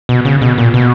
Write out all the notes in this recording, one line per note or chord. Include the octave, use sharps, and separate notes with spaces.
B2
C#3
B2
A#2
B2